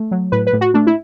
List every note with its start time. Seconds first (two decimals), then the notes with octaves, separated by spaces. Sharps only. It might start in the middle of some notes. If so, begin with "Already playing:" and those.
Already playing: A3
0.11 F#3
0.32 A2 B4
0.47 B4
0.53 A2
0.61 F#4
0.74 A3 D4
0.87 E4